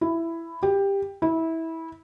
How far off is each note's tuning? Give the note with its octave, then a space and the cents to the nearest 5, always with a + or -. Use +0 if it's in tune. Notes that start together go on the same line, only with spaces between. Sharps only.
E4 +10
G4 +15
E4 -20